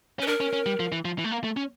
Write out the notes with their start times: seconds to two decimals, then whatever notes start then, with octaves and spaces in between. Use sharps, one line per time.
0.19 C#4 B4
0.27 D4 A#4
0.40 C#4
0.53 C#4
0.66 G3
0.80 F3
0.92 E3
1.05 F3
1.18 E3
1.24 A3
1.31 A#3
1.44 A3
1.57 C#4